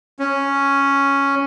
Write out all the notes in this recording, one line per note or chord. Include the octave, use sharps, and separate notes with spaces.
C#4